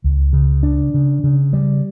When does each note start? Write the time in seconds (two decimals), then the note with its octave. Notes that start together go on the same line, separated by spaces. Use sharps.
0.04 C#2
0.33 C#3
0.63 D4
0.94 C#3
1.24 C#3
1.53 G3